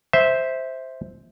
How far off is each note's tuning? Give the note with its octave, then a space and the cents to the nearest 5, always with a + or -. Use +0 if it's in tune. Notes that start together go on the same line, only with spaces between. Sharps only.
C5 +0 E5 -10